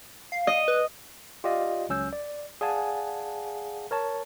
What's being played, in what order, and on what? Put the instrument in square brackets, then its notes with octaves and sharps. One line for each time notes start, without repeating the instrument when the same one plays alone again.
[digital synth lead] F5
[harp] D#5
[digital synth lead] B4
[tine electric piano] F4 G4 D5 D#5 F5
C#2 F#3 C#4 E6 G6
D5
G#4 D5 F5 F#5 G#5 A5
A#4 C#5 A5